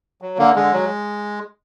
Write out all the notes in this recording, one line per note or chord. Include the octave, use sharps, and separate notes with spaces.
F#3
D3 A#3
D3 G#3
F#3